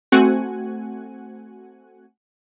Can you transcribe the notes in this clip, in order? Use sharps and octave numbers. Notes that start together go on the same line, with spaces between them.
A3 C4 F#4 F#5 G#5